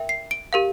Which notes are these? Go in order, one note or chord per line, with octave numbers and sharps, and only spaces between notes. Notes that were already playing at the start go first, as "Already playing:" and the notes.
Already playing: A#4 E5 G5
C7
D7
G4 A#4 F5